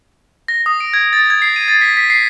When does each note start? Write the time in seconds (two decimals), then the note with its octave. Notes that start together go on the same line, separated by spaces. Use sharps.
0.48 A#6
0.66 D#6
0.80 D7
0.94 G#6
1.13 A6
1.30 G#6
1.42 C7
1.56 D#7
1.68 A6
1.81 B6
1.97 B6
2.10 C7